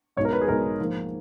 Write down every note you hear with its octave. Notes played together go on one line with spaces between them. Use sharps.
B1 B2 G#3 C#5
A#4
B4
G#4
B1 B2 G#3 A#4
G#2 F3 A#3